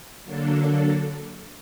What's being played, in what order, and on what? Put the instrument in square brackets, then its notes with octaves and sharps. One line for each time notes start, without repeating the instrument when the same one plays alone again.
[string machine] D3 F#3 A#3 D4 A4